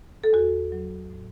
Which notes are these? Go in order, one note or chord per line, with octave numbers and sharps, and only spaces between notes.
A4
E2 F#4
F#3
A2